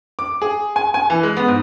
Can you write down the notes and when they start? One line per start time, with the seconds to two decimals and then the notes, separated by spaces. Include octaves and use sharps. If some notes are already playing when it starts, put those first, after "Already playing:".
0.19 D6
0.42 G#4
0.76 G#5
0.94 G#5
1.10 E3
1.23 G#3
1.37 B3
1.48 G#2